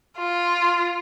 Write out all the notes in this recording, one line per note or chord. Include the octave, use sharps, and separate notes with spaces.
F4